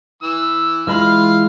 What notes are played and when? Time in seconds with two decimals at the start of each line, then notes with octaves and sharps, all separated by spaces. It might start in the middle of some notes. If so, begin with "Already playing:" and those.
0.23 E3 E6
0.87 E3 G#3 F4 B5 F6